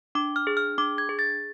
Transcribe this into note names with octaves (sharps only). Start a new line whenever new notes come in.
D4 D6
F6
G#4
F6
D4 D6
G#6
G#4
A6